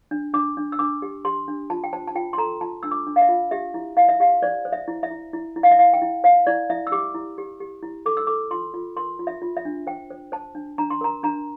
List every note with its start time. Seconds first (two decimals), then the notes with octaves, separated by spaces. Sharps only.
0.11 D4
0.34 D4 D6
0.57 D4
0.72 E6
0.79 D4 D6
1.02 G4
1.25 G4 C6
1.48 D4
1.70 F4 A5
1.84 G5
1.93 C5 A5
2.08 A5
2.15 F4 G5
2.33 C6
2.38 A4 A#5
2.61 F4 A5
2.83 D4 E6
2.91 D6
3.07 D4
3.16 F5
3.21 E5
3.29 F4
3.51 G4 E5
3.74 E4
3.97 E4 F5
4.09 E5
4.20 G4 F5
4.42 C5 D5
4.65 C5
4.72 E5
4.88 E4
5.03 E5
5.11 E4
5.33 E4
5.56 E4
5.63 F5
5.71 E5
5.79 E4 F5
5.94 G5
6.02 E4
6.24 C5 F5
6.47 E4 D5
6.70 E4 E5
6.87 E6
6.92 G4 D6
7.15 E4
7.38 G4
7.60 G4
7.83 E4
8.06 A4 D6
8.17 E6
8.27 A4 D6
8.51 F4 C6
8.74 F4
8.96 A#4 C6
9.19 F4
9.27 E5
9.42 F4
9.57 E5
9.65 D4
9.87 C5 G5
10.10 C5
10.32 C5 A5
10.55 D4
10.78 D4 A#5
10.90 C6
11.01 A#4 A#5
11.23 D4 A#5